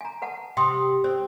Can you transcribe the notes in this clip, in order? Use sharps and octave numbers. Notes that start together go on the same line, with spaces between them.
G#5 A#5
B4 F#5 A5
C3 G5 C6 D#6
C4 C5